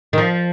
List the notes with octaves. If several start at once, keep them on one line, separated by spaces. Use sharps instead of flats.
D#3
F3